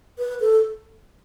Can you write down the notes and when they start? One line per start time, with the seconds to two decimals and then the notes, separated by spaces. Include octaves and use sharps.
0.19 B4
0.40 A4